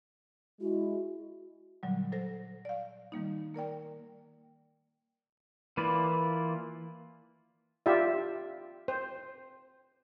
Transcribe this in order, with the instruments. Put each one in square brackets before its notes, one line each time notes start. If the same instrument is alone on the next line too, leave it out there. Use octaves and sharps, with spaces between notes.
[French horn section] G#3 E4 [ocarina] F#4
[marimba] A#2 D3 F#3 G3
F#3 A4 C5 A#6
D5 F5
D#3 G3 A#3 D#4
A#3 A#4 D5 G5
[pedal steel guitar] E3 A#3 F4 B4 D5
[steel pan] F4 G4 D5 E5
C5